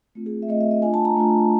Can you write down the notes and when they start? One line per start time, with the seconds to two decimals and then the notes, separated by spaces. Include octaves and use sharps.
0.15 A3 C4 F4
0.26 G#4
0.42 E5
0.49 A3 C4 F4 D#5
0.61 E5
0.71 D#5
0.82 A3 D4 F4 G#5
0.94 A5
1.05 A#5
1.16 A3 D4 F4